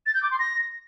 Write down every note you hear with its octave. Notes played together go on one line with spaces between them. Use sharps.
A6
G6
D6
C6
A#6